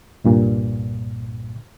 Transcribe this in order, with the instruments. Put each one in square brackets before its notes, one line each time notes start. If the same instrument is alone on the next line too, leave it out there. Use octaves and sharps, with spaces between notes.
[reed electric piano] C2 G2 A#2